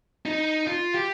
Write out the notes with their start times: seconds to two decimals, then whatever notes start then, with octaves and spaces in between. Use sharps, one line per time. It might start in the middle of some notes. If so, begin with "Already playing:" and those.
0.26 D#4
0.67 F4
0.95 G4